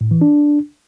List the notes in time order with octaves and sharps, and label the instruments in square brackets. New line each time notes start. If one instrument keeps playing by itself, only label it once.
[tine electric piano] A2
E3
D4